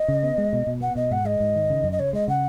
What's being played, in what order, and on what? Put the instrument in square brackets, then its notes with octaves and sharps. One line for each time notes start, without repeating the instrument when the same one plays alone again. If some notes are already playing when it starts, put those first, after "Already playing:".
Already playing: [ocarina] D#5
[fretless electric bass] C#3
B3
G#3
B2
B2
[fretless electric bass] B3 [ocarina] F#5
[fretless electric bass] B2 [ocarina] D#5
[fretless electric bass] G#2 [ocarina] F#5
[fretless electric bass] G#3 [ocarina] D#5
[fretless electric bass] G#2
D#3
C#3
F#2
[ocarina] D#5
[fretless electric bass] C#3 [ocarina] C#5
[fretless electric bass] G#3 [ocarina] D#5
[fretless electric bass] C#3 [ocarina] F#5